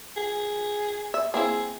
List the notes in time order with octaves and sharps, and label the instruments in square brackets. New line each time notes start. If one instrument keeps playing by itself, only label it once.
[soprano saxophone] G#4
[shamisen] E5
[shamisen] A#3 C4 E4 [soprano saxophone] G#4